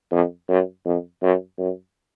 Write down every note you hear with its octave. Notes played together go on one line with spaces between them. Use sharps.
F2
F#2
F2
F#2
F#2